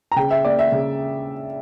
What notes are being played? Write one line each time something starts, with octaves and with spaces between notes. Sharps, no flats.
A#5
C#3 G5
E5
A#3 D5
E5
C#3